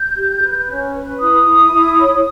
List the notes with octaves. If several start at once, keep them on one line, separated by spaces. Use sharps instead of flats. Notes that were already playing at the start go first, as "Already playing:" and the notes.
Already playing: G6
G4
B4
C#4
B4
E4 D#6
E4
E4
C#5